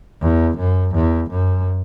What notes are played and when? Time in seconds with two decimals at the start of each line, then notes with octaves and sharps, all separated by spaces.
0.22 E2
0.58 F#2
0.95 E2
1.31 F#2